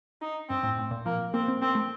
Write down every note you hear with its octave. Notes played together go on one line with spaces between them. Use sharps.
D#4
G2 C4
A2
A2
A#2
F3 A#3
A#3 C4
C4
A#3 C4
A3